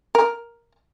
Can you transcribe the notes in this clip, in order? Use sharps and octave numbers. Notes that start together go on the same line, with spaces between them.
A#4